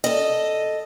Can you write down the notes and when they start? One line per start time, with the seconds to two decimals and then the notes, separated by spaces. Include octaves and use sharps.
0.04 A4 D#5